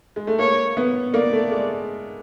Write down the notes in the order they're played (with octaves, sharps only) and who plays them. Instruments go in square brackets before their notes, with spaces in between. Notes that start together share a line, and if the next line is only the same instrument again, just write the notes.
[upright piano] G#3
A3
[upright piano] A#3 [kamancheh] C#5
[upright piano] B3
[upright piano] A#3 [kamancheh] D5
[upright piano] A3
G#3